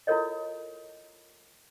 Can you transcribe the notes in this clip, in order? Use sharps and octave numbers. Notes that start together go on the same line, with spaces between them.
E4 F4 A4 A#4 C#5 D#5